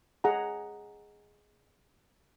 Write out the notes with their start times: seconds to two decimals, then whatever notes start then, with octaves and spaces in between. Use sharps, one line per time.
0.24 G#4 F#5 A#5